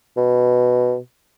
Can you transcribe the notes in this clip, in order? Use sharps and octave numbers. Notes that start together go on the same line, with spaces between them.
B2